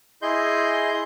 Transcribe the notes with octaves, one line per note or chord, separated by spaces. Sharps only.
E4 G#4 D#5 C6 G6